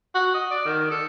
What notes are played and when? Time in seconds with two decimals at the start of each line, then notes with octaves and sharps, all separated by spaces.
0.15 F#4
0.34 D#5
0.51 D5
0.65 D#3
0.91 A4